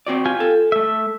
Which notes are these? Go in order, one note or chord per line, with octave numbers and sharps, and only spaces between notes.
C4 F#4 D5
F4 G4 G#5
A4
A3 E5